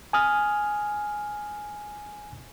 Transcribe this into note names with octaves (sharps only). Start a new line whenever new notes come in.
G#5 D#6 F6